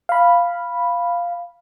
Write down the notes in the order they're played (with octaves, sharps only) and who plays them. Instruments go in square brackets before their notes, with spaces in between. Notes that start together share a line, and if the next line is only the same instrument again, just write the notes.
[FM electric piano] F5 B5